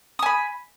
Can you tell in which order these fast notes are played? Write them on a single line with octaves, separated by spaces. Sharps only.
D#6 G#5 B5